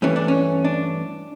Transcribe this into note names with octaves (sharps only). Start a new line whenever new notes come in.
G2 E3 A3 C#4
D4
C#4
D4